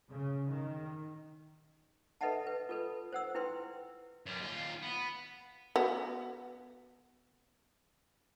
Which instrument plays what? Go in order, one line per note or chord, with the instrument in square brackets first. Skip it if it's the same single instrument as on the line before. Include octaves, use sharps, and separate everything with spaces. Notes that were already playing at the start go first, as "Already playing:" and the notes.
[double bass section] C#3
D#3
[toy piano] A4 B4 D#5 E5 F#5 A5
B4
F4 A4 B4
C5 F#5 E6
E4 B4 G5 C6
[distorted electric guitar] F#2 G3
D#2 F4
B3
[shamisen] B3 F#4